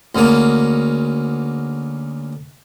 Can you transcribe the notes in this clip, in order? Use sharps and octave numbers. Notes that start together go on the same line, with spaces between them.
D2 C#3 A#3